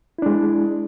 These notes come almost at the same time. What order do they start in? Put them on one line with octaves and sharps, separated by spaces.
E4 D4 G#3